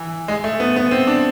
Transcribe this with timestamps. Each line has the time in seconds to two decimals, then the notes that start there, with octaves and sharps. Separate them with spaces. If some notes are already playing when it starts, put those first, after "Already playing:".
Already playing: E3
0.28 G#3
0.44 A3
0.60 B3
0.76 B3
0.91 C4
1.07 D4